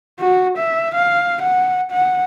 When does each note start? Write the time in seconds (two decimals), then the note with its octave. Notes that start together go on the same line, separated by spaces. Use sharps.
0.19 F#4
0.57 E5
0.94 F5
1.41 F#5
1.91 F#5